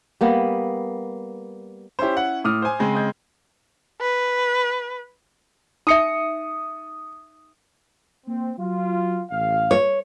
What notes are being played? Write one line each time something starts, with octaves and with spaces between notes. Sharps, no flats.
G3 A#3 B3
C#4 E4 G4 C5
F#5
A2 D6 D#6 F6
C5 G#5
C#3 G#3 C4
D#5 G6 G#6
B4
D#4 E5 D#6 C#7
A#3 C4
F#3 F4
A1 F5
C#5